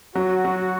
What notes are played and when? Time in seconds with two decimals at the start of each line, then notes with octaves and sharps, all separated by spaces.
0.15 F#3 F#4
0.45 F#3